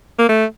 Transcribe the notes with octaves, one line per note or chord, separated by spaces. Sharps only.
A#3
A3